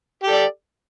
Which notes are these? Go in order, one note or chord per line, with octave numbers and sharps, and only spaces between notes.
G4 A4 D5